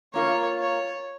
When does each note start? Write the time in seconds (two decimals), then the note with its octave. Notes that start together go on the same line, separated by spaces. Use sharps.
0.13 A#3 F4 A#4 C#5
0.58 C#5